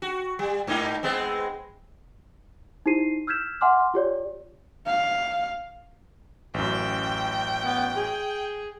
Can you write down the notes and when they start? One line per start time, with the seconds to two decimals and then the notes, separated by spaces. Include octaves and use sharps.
0.02 F#4
0.39 G3
0.67 G#2 A#3 D#4
1.03 G#3 B3 C4
2.86 D#4 E4 G4 C5 C7 D#7
3.27 E6 F6 G6 G#6 B6 E7
3.61 E5 F#5 G#5 C6 D6 F6
3.94 F4 G4 C#5 D5
4.86 F5
6.54 A1 F#2 G5
7.64 B3
7.96 G#4